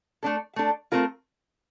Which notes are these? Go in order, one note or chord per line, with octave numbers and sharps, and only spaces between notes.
A3 D4 A4
A3 D4 A4
A3 C4 F4 A#4